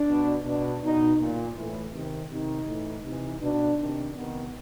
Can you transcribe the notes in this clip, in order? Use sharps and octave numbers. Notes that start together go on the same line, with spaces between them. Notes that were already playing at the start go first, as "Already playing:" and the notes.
Already playing: D4
B2
B2 D4
B2 D#4
A#2
A2 E3
C3 D#3
C3 D#3 D#4
A2 E3
C3 E3 D#4
B2 D4
C3 D#3 D4
C3 D#3 B3